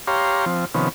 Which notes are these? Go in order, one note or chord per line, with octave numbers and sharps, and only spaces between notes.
G4 C#5 F5 A#5 C6
F3 C4
C3 D#3 F3 B3 C#4